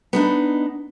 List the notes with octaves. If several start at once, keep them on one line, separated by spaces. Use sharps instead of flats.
B3 D4 D#4